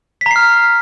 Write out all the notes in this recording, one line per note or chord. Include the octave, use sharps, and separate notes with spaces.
A#5 F6 B6 C7